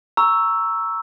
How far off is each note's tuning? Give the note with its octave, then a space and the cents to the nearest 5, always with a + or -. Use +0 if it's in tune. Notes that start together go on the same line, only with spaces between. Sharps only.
A#5 +0 C#6 +0 E6 +0